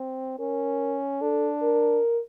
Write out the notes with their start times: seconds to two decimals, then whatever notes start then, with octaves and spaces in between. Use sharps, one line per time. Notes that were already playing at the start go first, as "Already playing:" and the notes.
Already playing: C4
0.39 C#4 A#4
1.21 D4 A4
1.63 A#4